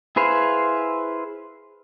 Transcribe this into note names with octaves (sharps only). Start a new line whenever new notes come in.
E4 G#4 B4 C5 F5